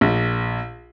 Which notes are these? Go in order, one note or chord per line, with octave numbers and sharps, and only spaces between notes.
A#1